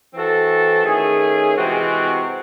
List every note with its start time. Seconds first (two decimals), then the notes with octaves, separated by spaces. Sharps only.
0.13 E3 C4 F#4 A4
0.83 D#3 A3 C#4 G#4
1.55 C3 E3 G#3 C4 F#4